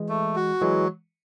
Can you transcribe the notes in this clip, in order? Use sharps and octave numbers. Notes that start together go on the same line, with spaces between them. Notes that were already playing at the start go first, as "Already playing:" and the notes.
Already playing: E3 G#3
A3
F#4
E3 F#3 G#3